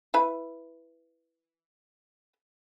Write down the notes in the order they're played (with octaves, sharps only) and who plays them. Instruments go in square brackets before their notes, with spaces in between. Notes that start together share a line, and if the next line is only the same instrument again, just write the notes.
[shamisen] E4 B4 B5